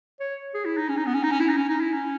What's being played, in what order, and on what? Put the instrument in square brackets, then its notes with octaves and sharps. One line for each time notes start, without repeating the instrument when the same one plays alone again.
[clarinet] C#5
G#4
E4
D#4
C#4
D#4
B3
C#4
D#4
C#4
E4
D#4
C#4
D#4
E4
C#4